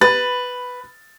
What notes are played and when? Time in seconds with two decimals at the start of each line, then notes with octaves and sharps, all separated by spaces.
0.01 B4 B5 A6